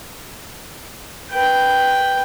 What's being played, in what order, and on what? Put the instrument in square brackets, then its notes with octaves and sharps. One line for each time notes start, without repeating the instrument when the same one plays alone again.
[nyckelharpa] B4 G5